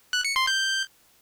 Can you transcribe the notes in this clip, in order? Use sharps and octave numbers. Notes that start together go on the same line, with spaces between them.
F#6
C#7
C6
G6